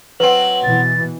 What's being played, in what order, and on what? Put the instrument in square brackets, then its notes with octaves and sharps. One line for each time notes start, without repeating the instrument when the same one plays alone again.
[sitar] F#3 C4 [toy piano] B4 [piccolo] F#7
[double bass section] B2 E3 [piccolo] A6